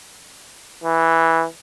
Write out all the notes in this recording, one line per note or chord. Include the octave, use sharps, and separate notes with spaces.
E3